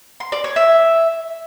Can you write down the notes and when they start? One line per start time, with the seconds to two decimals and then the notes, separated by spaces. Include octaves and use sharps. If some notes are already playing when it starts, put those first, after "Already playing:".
0.20 C6
0.32 D5
0.44 C#5
0.56 E5